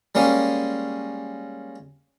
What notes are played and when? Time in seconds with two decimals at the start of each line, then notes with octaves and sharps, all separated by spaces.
0.15 G3 G#3 A#3 C#4